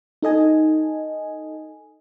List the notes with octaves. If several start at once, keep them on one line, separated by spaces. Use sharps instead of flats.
D#4 A4 D#5 G#5